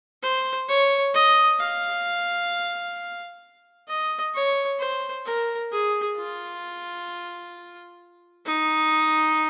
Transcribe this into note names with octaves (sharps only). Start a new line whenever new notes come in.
C5
C#5
D#5
F5
D#5
C#5
C5
A#4
G#4
F4
D#4